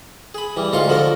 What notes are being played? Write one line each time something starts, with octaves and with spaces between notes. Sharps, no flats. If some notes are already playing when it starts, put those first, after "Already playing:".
G#4 B5
E3 G3
D2 G#2 F4 F5 C6 C#6
D3 F3 F#4 A4 A#4